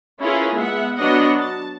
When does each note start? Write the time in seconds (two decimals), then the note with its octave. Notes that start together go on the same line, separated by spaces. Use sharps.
0.19 C#4 E4 F4 G#4 A#4 B4
0.55 G#3 B3 E5 F#5
0.96 F#3 B3 D4 F#4 D#5 F#5
1.38 A5